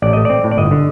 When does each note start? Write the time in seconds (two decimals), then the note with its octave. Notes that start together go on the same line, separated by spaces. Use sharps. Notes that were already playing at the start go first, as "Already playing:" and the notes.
0.02 A1 D5
0.13 A3 D#5
0.25 C4 D5
0.44 A2
0.51 D5
0.57 G1 D#5
0.71 D3